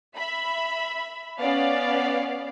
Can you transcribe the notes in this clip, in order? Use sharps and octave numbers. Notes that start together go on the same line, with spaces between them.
E5 B5
B3 C#4 D5 F5